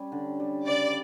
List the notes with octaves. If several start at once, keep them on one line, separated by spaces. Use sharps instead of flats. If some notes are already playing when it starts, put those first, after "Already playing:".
Already playing: G3 C#4 G4
D3
G3
C#3 D5